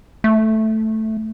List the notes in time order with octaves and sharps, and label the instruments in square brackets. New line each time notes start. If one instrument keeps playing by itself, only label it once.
[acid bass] A3